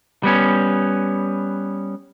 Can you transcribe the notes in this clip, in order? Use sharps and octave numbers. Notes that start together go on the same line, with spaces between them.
G3 B3 C#4